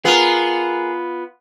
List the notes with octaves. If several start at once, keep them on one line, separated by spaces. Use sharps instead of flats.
B3 F4 G#4 A#4